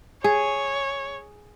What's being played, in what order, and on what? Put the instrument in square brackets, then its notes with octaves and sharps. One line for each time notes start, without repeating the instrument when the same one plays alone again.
[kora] G#4 [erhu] C#5